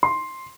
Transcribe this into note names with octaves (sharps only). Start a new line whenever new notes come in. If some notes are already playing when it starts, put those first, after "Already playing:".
C6